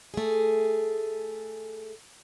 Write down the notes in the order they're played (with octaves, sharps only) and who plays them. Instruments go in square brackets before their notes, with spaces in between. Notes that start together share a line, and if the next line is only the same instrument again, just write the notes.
[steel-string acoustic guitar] A3 G#4